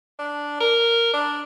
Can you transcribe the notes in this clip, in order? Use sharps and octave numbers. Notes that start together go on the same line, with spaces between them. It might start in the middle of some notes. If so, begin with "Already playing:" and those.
D4
A#4
D4